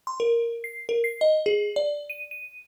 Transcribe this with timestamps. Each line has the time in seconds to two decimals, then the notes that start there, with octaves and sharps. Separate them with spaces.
0.07 C6
0.20 A#4
0.64 C7
0.89 A#4
1.04 C7
1.21 D#5
1.46 G#4
1.76 D5
2.10 D#7
2.31 D#7